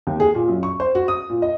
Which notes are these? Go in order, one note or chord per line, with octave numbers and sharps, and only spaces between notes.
D#2
G#4
A#2
F#2
C#6
C5
F#4
D#6
A#2
D#5